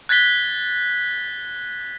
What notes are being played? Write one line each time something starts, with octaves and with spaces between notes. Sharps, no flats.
F#6 G#6 A6 B6 G7